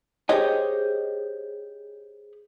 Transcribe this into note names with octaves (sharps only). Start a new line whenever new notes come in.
G4 G#4 C5 C#5 D#5 G5